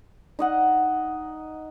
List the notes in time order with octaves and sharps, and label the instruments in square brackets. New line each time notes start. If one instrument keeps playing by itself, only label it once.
[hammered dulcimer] D#4 D#5 F#5